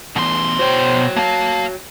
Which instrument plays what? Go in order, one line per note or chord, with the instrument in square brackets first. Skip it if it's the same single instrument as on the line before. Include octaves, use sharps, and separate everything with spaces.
[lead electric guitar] B2 C6 [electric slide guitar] E3 A3 B3
[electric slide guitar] F#4 C#5 G5 [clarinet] C5
[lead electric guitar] A#3 F5 [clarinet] A5